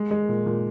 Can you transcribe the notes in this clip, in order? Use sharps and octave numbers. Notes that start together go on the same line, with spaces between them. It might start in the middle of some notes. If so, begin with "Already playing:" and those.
Already playing: G#3
G#3
A#2
A#2